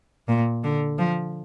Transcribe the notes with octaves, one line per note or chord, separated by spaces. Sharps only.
A#2
D3
F3